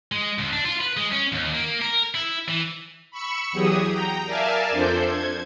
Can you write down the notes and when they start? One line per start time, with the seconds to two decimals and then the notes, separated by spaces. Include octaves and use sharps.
0.12 G#3
0.38 C#2
0.53 D4
0.66 F4
0.81 B4
0.97 G#3
1.12 C#4
1.32 D#2
1.54 A#3
1.82 A#4
2.15 E4
2.49 E3
3.11 B5 C#6 E6 C#7
3.52 E2 F#3 G4 G#4 D#6
3.90 G5 A#5
4.26 A#4 D5 E5 F5 G#5 A5
4.70 F2 F3 D4 A4 C5 G6
5.06 G#6